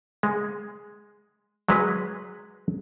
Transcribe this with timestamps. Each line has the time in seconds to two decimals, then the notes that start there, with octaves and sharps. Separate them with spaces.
0.23 G#3
1.69 F#3 G#3 B4